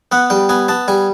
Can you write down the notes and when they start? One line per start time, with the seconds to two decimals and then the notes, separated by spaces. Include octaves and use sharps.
0.12 B3 F#5
0.30 G3 G5
0.49 B3 G#5
0.68 B3 A5
0.88 G3 G#5